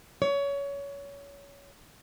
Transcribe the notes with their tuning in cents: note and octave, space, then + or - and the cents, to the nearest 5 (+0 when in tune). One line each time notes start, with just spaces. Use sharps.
C#5 +25